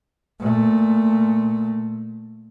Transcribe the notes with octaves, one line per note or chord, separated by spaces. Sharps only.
A#2 A3